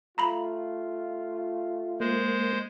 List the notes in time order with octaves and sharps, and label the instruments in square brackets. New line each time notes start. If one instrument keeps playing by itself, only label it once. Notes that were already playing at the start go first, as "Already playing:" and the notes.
[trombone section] A3 F4 [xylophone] A#5 B5 F#7
[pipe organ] G#3 C5 [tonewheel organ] A#3